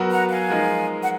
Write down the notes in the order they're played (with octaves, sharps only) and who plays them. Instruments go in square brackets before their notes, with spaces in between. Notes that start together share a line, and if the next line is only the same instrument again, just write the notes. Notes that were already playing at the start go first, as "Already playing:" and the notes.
Already playing: [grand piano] F#3 B3 F#4 A#4
[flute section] F#5 A#5
F5 G#5
[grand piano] F3 G#3 D#4 A#4
[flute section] F#5